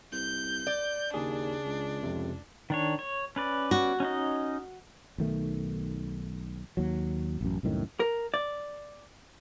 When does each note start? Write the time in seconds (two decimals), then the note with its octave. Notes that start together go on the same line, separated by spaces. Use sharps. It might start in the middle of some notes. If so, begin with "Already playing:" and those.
0.12 C2 G6
0.67 D5
1.14 D#2 C#3 D4 G#4
1.66 C#2
2.03 F2 C3
2.70 D#3 D4 C#5
2.99 C#5
3.36 C#4 B4 D5
3.71 F#4
4.00 C#4 D#4 D#5
5.18 B1 D#3 A3
6.77 D#2 F#3
7.41 A1 F#2
7.63 C2 F#2 A2 D#3
8.00 A#4
8.34 D5